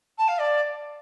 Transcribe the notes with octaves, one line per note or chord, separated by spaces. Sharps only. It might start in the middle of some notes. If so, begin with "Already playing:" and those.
A5
F5
D5